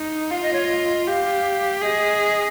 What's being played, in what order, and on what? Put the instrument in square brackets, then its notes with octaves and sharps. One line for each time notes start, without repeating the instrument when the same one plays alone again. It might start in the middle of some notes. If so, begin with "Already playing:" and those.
Already playing: [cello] D#4
[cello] F4 [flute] F5
[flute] D#5
C#5
D#5
[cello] G4 [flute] F5
[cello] G#4 [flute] D#5